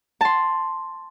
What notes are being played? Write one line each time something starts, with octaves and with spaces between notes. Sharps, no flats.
A5 C6